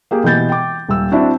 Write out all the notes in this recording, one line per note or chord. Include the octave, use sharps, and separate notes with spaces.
A#3 G4 G#4
B2 E3 G4 G6 A6
G5 D6
D#1 E6
C4 D4 E4 F#4